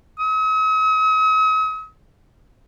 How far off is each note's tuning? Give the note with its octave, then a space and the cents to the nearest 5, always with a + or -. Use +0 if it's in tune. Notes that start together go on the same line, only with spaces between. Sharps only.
D#6 +45